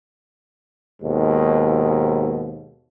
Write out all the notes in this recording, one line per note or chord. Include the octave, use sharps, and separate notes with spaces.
D#2 G#2 B2